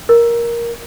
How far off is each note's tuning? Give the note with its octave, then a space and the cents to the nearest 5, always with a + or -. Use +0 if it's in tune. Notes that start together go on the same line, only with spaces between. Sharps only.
A#4 +10